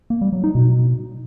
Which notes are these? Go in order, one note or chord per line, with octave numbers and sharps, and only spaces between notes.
A#3
G3
F#3
D#4
B2